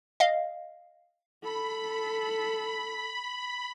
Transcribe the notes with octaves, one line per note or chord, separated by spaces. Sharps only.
D#5 F5
A4 B5